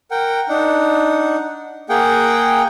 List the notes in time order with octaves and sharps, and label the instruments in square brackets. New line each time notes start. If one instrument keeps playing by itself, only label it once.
[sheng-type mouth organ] A#4 F#5 G5
D4 D#4 F#5
A#3 G#4 F#5 G5